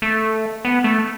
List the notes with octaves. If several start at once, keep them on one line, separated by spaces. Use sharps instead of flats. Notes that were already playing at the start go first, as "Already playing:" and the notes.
A3
B3
A3